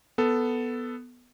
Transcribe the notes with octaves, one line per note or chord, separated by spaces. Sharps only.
B3 A4